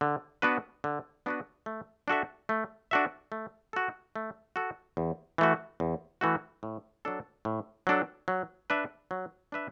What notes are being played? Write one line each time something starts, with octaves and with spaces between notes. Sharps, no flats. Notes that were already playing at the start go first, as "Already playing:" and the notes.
D3
B3 D4 F#4 B4
D3
B3 D4 F#4 B4
A3
D4 F#4 A4 E5
A3
D4 F#4 A4 E5
A3
F#4 A4
A3
F#4 A4
E2
E3 A3 F#4
E2
E3 A3 F#4
A2
F#3 D4 A4
A2
F#3 D4 A4
F#3
D4 B4 E5
F#3
D4 B4 E5